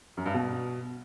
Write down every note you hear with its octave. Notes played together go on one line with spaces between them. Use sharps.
F#2
G2
B2